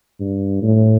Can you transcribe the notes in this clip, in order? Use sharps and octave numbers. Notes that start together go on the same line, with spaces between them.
G2
A2